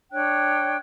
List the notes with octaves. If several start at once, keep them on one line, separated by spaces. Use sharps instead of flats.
D4 C#5 G5 F#6